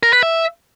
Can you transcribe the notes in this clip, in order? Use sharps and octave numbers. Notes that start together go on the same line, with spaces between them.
A#4
B4
E5